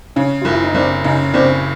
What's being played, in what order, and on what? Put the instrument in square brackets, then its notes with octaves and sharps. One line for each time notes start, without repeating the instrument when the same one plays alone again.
[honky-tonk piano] C#3 [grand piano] C#4
[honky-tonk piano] F#1 [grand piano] F4
[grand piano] E4
D#4
[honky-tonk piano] F#1 [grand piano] C4 D4
[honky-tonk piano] C#3 [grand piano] C#4 D#4
[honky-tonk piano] F#1 [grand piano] C4 D4